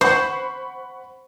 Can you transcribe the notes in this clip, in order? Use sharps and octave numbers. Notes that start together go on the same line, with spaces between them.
C5 F#5 B5 C#6